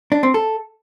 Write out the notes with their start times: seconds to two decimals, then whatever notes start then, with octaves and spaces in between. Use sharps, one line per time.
0.12 D4
0.23 C4
0.34 A4